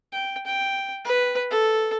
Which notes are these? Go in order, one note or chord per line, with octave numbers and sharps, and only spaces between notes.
G5
G5
B4
A4